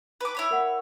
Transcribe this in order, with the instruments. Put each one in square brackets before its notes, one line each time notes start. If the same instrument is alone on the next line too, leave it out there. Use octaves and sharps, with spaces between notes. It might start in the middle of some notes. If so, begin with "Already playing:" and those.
[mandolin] B4 D6
E4 C#5 B5
[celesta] A#4 F#5